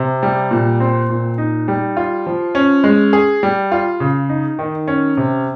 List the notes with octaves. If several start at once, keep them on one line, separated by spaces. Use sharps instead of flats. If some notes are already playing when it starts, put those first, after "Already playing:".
Already playing: C3
G3
A#2
C4
A#2
D#4
G3
F4
F3
C#4
G#3
G#4
G3
F4
C#3
D#4
D#3
C#4
C3